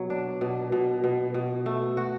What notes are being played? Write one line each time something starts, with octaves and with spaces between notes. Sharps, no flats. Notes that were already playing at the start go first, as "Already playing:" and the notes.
Already playing: B2 F#3
D4
B2
B2
B2
B2
A3
F#4